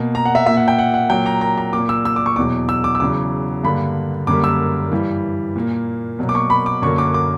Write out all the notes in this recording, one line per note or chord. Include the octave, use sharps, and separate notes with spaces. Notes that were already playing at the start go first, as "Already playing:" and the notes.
Already playing: B2 A#3
A#5
F#5
E5
A#2 A#3 E5
F#5
G5
F#5
F#5
A#2 F#3 A#3 G5
A#5
A#5
A#5
A#2 A#3 D6
E6
E6
D6
C#6
E2 B2 F#3 D6
E6
D6
E6
E2 C#3 F#3 D6
G2 D3 A#3 B5
F#2 D3 G3 A#3 D6
E6
G2 E3 G3
A#2 A#3
B2 F#3 A#3
D6
C#6
B5
D6
F#2 D3 F#3 A#3 C#6
D6
D6